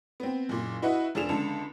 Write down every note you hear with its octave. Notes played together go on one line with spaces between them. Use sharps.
B3 C4
F#1 A#2
E4 F#4 B4 D#5 E5 F#5
F1 F3 D4 G#4 E7 F7
C#2 D3 A5